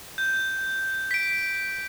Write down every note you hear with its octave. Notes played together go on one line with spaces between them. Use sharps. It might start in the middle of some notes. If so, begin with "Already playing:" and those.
G6
B6 D7